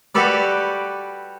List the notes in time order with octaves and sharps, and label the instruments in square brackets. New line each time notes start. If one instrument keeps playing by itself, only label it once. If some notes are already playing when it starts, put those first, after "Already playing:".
[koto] G3 F#4 G4 A4 B4 D5